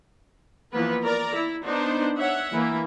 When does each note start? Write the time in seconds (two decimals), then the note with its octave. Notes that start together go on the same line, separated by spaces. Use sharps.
0.72 E3 F3 A#3 B3 B4
1.03 A#4 D5 A#5
1.35 E4
1.64 B3 D4 D#4 C5
2.18 C#5 E5 F#5
2.53 E3 A#3 E4